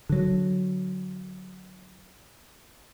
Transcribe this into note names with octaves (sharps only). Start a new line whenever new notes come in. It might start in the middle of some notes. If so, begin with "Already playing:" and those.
D3 F#3